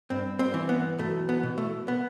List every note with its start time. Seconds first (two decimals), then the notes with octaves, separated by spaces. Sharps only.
0.10 G2 C4
0.39 C4
0.54 E3
0.69 B3
0.98 B1 A3
1.29 B3
1.43 B2
1.58 A3
1.88 B3